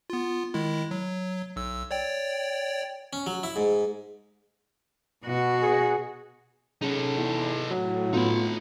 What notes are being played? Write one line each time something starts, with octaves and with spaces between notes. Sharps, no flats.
B3 F4
D#3 G#3 E4
F#3
B1 E6
C#5 D5 G5
C#4
F#3
E4
G#2
B2 F#4
G#4
C#3 D#4 A4
E2
A2 F#3
B3 D#4 F4 B5